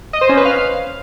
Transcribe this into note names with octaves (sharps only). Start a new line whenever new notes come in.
D#5
C5
C#4
B4
F5